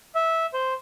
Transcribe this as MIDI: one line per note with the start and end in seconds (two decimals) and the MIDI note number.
0.15 0.46 76
0.54 0.74 72